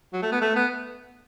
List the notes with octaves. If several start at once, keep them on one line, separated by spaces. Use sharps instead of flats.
F#3
A3
B3
A3
B3